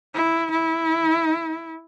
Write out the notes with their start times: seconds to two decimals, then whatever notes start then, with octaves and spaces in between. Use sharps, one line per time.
0.14 E4
0.51 E4